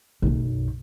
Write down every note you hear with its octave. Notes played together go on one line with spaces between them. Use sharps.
B1 F#2